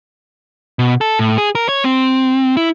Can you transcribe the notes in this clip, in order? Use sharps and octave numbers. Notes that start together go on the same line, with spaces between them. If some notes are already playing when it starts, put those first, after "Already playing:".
B2
A4
A2
G#4
A#4
C#5
C4
E4